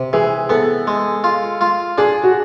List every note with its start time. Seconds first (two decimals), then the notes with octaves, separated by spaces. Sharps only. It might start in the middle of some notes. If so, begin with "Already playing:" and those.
Already playing: C3
0.13 E3 G#4
0.50 B3 A4
0.87 G#3
1.24 F4
1.61 F4
1.98 D4 G#4
2.24 F#4